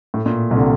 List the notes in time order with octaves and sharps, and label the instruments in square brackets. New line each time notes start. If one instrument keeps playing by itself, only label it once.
[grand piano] A2
A#2
C2 C3
D3